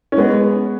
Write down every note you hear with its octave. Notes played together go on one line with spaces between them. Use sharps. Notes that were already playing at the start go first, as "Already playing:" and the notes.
C#4
G#3 B3